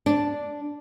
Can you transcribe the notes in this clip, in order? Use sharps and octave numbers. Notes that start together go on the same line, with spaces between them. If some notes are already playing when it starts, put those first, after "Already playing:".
D4